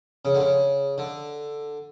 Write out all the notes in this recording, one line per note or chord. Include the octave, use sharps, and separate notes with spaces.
C#3
D3
C#3
D3